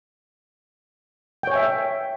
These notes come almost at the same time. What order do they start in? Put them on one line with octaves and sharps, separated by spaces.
G5 C#5 G#5 E5